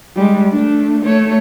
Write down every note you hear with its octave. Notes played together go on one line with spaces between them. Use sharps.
G3 G#3
A3 D4
A3 C#5